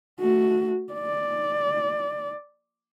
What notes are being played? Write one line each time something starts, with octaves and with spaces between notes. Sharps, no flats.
A3 F#4
D5